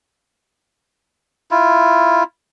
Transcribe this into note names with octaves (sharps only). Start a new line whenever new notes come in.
E4 F4